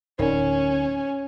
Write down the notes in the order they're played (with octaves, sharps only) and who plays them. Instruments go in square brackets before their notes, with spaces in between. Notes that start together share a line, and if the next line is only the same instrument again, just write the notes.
[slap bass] D1 [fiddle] C#4 [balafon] D#4 A#4 D5